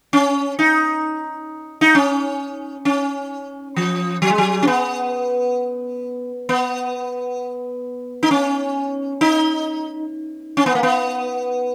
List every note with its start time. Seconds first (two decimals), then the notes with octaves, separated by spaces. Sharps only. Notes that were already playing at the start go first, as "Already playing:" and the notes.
0.13 C#4
0.59 D#4
1.81 D#4
1.95 C#4
2.85 C#4
3.76 F3
4.22 F#3
4.30 G#3
4.38 F#3
4.62 C#4
4.67 B3
6.49 B3
8.23 D#4
8.31 C#4
9.21 D#4
10.57 C#4
10.66 B3
10.75 A#3
10.83 B3